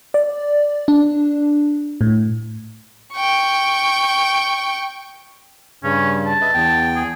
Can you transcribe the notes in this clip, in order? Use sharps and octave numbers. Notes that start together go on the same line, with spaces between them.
D5
D4
A2
G5 C#6
G2 C#3 C#4
A5
B4 D#5 E5
E2 G5
G#4